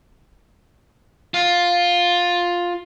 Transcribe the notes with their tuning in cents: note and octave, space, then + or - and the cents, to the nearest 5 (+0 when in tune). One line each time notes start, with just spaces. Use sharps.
F4 +10